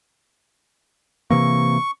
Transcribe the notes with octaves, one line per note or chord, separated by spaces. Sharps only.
C3 E3 A#3 C#6